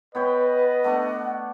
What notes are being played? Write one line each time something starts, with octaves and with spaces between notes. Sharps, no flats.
B3 B4 C#5 D#5 G5
A3 B3 D4 F#5